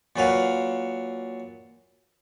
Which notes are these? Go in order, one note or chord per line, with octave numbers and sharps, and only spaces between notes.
A#2 F#3 B4 F5